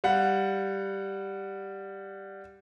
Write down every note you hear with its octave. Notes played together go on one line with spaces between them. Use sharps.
G3 F5 F#5